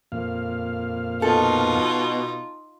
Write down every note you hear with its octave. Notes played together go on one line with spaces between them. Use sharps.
F2 A#2 F5
B2 D#4 F4 A4